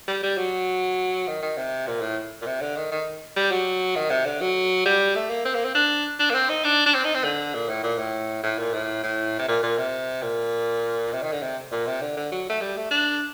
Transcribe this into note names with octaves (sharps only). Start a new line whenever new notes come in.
G3
G3
F#3
D#3
D#3
C3
A#2
A2
A#2
C3
D3
D#3
D#3
G3
F#3
D#3
C3
D3
F#3
G3
A3
A#3
C4
A#3
C4
D4
D4
A#3
C4
D#4
D4
D4
C4
D#4
C4
D3
A#2
A2
A#2
A2
A2
A#2
A2
A2
C3
A#2
A#2
C3
A#2
C3
D#3
D3
C3
A#2
C3
D3
D3
F#3
A3
G3
A3
D4